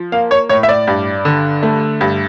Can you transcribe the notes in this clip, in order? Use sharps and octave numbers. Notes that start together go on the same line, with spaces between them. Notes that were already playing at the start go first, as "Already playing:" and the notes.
Already playing: F3
A#3 F5
C#5
A2 C#5
E5
D5
G2
D3
A3
G2